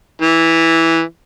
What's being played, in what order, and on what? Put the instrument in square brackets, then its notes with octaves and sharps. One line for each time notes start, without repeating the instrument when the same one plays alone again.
[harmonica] E3